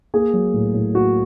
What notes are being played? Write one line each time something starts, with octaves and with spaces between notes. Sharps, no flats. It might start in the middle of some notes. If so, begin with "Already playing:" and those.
A#3 G#4
F#3
A2
A2
A#3 F#4